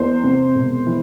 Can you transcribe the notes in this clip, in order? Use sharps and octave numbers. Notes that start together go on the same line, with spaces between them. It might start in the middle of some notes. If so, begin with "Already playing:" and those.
Already playing: E2 C5
C3
E1
E3